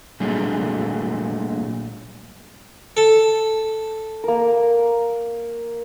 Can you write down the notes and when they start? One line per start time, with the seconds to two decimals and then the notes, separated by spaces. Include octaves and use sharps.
0.20 A#2 F#3 G3 A3 D4 G#4
2.97 A4
4.24 A#3 A#4